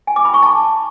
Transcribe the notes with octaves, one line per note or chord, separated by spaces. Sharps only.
G#5
D6
B5
C#6
A5